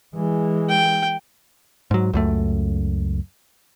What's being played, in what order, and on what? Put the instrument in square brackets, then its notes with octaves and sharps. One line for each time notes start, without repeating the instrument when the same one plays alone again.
[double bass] E3 G#3
[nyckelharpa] G5
[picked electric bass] G#2 F#3
C#2 F#2 A3